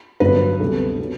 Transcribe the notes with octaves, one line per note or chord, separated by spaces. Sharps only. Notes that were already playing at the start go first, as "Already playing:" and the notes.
G1 G2 F#3 B4
D2 C3 G3 B3 A4
F#3 B3